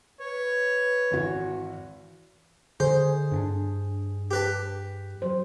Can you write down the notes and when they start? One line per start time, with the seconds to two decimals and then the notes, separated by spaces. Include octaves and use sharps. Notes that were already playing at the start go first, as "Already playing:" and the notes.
0.20 B4 C#5
1.11 G#1 E3 F#4
2.80 D3 G#4 C5
3.32 G2 C#4 D4
4.31 G4 B4 A5
5.22 F#3 C5